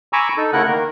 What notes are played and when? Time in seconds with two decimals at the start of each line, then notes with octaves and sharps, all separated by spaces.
0.13 G#5 A#5 B5 C#6 D6 E6
0.37 D#4 A4
0.53 C#3 A3 E4 A#4 F#5 F#6
0.68 D#3 A#3 A#4